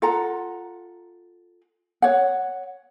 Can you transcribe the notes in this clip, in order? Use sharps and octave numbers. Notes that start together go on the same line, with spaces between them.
F4 A4 F#5 A#5
C#5 F#5